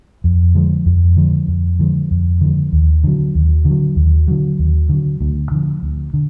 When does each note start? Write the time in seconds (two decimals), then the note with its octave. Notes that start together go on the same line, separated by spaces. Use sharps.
0.24 F2
0.55 D3 F3 G#3
0.86 F2
1.17 D3 F3 G#3
1.48 F2
1.79 D3 F3 G#3
2.11 F2
2.41 D3 F3 G#3
2.72 D#2
3.04 D3 F#3
3.35 D#2
3.65 D3
3.70 F#3
3.96 D#2
4.28 D3 F#3
4.59 D#2
4.89 D3 F#3
5.20 D2
5.51 D3 F3
5.83 D2
6.14 D3